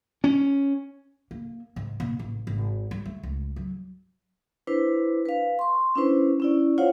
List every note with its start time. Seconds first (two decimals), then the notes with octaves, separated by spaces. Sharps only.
0.24 C#4
1.31 A#3
1.76 G#2
2.00 A#2
2.19 A1
2.47 G#1
2.91 G3
3.06 A3
3.23 C#2
3.56 F#3
4.67 D4 E4 B4 C5
5.25 B4 F5
5.59 C6 C#6
5.95 C#4 D4 E4 B4 C5
6.40 C#4 E4 D5
6.78 F4 C5 C#5 F5 F#5